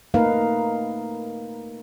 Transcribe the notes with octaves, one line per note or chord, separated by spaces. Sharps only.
A3 A#3 D#4 A#4 B4 F5